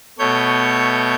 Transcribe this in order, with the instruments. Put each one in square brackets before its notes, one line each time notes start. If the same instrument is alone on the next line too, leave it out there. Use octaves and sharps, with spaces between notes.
[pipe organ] B2 A3 C#5 G6